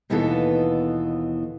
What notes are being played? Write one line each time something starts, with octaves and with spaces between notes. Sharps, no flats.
D#2 B2 E3 B3 F4 A4